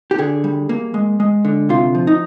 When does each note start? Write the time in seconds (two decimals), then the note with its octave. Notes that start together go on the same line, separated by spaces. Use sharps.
0.11 G4
0.19 D3 G#4
0.44 G3
0.69 A#3
0.94 G#3
1.20 G#3
1.45 D3
1.69 C3 F4
1.95 F3
2.07 D#4